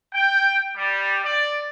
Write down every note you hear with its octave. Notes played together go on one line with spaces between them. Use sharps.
G5
G3
D5